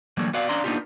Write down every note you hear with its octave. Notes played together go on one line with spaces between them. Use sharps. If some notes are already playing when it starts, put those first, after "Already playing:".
D3 E3 F#3 G3 A3 A#3
B3 F#4 D5 F5
C#4 D4 D5 F5 A#5 C6
A#3 B3 D4 D#4 F4 G4